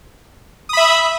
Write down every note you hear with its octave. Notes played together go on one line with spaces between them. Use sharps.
E5 B5 D#6